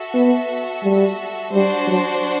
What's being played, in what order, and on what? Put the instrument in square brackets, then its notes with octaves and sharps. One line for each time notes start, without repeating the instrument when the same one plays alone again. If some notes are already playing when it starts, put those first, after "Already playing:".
Already playing: [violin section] F#4 A4 E5
[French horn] B3
G3
[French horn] G3 [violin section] D4 F#4 C5
[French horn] F#3